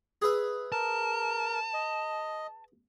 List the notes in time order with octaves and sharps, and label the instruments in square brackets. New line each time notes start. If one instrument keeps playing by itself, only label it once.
[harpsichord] G#4 B4 E5
[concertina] A#4 [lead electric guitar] A5
[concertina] D#5